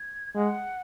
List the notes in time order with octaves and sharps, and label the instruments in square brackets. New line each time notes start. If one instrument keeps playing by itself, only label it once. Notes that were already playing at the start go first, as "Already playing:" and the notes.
Already playing: [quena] G#6
[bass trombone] G#3 [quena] F#5